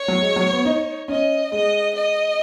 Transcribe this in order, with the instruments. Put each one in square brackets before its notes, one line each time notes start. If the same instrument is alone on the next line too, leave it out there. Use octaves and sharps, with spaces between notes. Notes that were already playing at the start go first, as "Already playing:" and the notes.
Already playing: [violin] C#5
[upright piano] F#3
G#3
F#3
B3
D#4
[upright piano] C#4 [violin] D#5
[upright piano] G#3 [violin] D#5
[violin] D#5